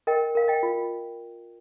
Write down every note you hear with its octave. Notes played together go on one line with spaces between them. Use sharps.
A#4 D#5 G5
A#4 F5
D#5 G5
F4